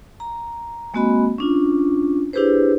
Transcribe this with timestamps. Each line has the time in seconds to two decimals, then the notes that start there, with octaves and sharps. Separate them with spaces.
0.20 A#5
0.94 G#3 A#3 C4 F#4 D#5 B5
1.38 C#4 D4 F4
2.33 D4 E4 G4 G#4 B4 C5